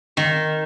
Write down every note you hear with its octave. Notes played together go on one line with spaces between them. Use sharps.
D#3